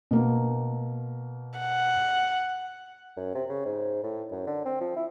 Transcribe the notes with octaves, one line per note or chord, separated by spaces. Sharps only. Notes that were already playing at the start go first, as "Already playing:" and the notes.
B2 A#3
F#5
F#2
C3
C#3
G#2
A2
F#2
D3
C4
F3
E4